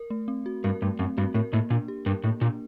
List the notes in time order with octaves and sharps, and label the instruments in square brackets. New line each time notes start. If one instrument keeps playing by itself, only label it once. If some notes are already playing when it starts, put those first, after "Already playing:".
Already playing: [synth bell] A#4
A3
C4
F#4
[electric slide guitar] G2 [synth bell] A#4
[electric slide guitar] G2 [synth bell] A3
[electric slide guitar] F#2 [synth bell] C4
[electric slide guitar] G2 [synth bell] F#4
[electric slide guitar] A2 [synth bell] A#4
[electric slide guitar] A2 [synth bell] A#3
[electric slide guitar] A#2 [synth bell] D4
[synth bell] G4
[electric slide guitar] G2 [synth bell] A#4
[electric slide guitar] A2 [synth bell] A#3
[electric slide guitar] A#2 [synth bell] D4